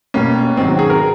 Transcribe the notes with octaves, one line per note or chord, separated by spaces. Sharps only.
B2 G3 A#3 C#4
G#2 D#3 F#3 C4
F#4
G#4
A#4